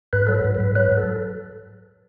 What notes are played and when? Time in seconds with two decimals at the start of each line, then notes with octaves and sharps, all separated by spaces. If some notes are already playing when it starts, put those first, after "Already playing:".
0.13 G#2 B4
0.27 F#3 A4
0.34 B4
0.44 G#2
0.55 B4
0.60 G#2
0.75 F#3 B4
0.92 G#2
0.97 A4